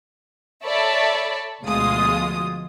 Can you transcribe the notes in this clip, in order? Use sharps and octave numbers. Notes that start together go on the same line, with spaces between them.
A4 C#5 D5 E5 A5 B5
D2 B2 F3 G#3 F4 D#6